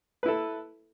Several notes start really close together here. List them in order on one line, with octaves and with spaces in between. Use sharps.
B4 E4 A4